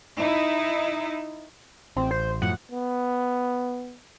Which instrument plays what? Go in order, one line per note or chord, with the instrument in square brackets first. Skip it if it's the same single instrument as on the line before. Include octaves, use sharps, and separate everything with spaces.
[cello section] D#4 E4
[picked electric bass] A1 [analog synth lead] C4
[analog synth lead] C5
[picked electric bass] F#2 A2 F3 [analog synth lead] F#5
[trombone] B3